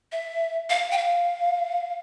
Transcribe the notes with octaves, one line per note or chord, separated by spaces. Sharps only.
E5
F5
G5
F5